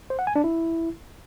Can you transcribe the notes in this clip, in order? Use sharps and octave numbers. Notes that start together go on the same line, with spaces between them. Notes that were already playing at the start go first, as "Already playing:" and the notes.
C5
F#5
G#5
D4
E4